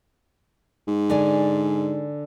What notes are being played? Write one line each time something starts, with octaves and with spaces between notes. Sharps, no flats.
G#2
D3 D5 G#5